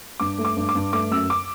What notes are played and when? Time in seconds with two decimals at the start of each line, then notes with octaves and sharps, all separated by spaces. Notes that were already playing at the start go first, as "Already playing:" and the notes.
0.20 G2 D6
0.38 A3
0.45 D6
0.57 G2
0.69 D6
0.75 G2
0.93 A3 D6
1.11 F#2 E6
1.30 D6